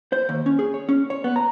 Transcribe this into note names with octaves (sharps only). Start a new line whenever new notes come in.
C5
D#2
C#4
G#4
C#5
C#4
C#5
B3
A#5